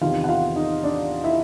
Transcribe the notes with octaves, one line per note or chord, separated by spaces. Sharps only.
E2 C3 D#3 F4 F5
F#5
F4 F5
D#4 D#5
D4 D5
E4 E5